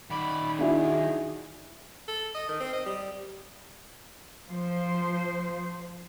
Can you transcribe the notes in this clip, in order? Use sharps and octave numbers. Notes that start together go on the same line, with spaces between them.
D#3 D5 B5
D4 E4 F#4 G#4
A4
D#5
D#3
C4
D#5
G3
F3 C5